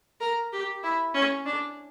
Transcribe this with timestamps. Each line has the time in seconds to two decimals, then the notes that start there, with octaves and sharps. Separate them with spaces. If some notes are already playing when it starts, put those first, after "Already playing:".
0.20 A#4
0.53 G4
0.83 E4
1.14 C#4
1.45 D4